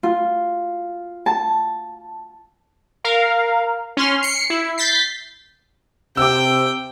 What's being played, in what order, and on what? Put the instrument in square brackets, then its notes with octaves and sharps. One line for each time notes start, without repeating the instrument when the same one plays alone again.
[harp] F4
A5
[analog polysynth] A#4 F5
C#4 C6 F6
C7 C#7
E4
G6 A6 B6 C7
[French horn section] C3 [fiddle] G5 [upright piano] D6 E6